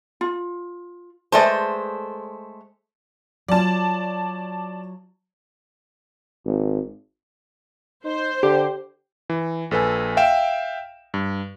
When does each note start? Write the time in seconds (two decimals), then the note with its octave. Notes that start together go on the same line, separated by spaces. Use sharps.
0.21 F4
1.32 G#3 A3 B4 C5 D5 A5
3.48 F#3 F4 D5 A5
6.45 G#1
8.04 D#4 C5
8.43 D3 G4
9.30 E3
9.71 A#1 A4 B4 G#5
10.17 E5 F5 G5 D7 E7
11.14 G2